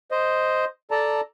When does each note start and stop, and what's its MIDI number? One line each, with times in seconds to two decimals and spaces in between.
0.11 0.65 72
0.11 0.65 75
0.91 1.21 69
0.91 1.21 74
0.91 1.21 81
0.91 1.21 82